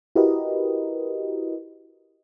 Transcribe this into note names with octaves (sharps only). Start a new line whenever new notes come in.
E4 F#4 G4 A#4 B4 D#5